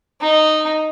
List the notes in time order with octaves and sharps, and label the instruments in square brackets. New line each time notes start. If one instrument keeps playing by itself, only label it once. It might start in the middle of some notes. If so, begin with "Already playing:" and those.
[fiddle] D#4